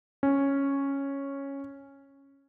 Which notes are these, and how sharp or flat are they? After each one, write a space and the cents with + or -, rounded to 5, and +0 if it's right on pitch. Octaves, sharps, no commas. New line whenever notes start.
C#4 -5